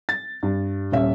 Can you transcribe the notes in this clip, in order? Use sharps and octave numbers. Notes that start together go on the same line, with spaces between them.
A6
G2
D#1 C#4 E5